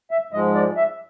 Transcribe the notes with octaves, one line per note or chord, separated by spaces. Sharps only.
E5
G#2 F3 G#3 D#5
D5
E5